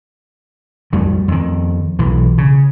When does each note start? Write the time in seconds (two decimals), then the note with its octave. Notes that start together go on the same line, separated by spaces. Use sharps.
0.93 F2 G3 A3
1.28 F2 D#3
1.99 B1 E3
2.38 C#3